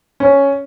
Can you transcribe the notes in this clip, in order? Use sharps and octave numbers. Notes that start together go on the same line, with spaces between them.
C#4